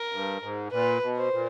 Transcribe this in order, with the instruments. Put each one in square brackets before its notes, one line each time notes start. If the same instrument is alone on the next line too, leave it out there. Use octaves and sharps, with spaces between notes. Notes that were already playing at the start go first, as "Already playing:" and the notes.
Already playing: [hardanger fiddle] A#4
[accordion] G2
G#2
[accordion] A#2 [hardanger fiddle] B4
[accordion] B2
[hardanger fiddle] C5
[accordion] A#2